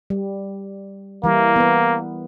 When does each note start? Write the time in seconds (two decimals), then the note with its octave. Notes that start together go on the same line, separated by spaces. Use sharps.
0.10 G3
1.24 E3 G3 A#3 E4
1.56 B3 A#4 B4